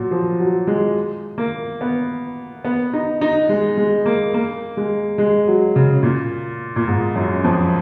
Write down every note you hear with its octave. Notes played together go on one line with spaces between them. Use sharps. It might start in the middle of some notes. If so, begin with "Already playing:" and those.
Already playing: A#2 F#3
F3
F#3
G#3
A#3
B3
B3
D#4
D#4
G#3
G#3
A#3
A#3
G#3
G#3
F#3
C#3
A#2
A#2
G#2
F#2
F2